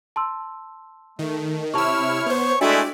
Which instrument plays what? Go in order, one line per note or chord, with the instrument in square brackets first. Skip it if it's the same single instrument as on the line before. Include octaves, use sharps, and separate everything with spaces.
[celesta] A5 C6 E6
[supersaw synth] D#3 [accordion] A3
[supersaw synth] C3 E6 [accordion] E4 F6 [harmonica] C#5 [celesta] A5 C#6
[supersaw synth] B3 C5
[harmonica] G#3 A3 E4 [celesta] D4 F#4 G5 [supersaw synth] D5 [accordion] G#5